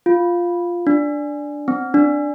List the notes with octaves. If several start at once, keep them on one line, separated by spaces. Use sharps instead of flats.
F4
D4
C4
D4